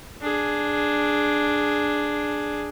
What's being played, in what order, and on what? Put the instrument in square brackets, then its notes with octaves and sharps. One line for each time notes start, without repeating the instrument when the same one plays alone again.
[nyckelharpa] D4 G#4